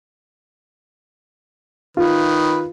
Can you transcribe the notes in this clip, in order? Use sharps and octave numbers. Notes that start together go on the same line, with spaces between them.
D#3 F4 B4